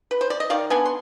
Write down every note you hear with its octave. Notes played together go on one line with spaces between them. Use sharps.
B4
C5
D5
D#5
D#3 D5 F5
B3 D4 G#5
C6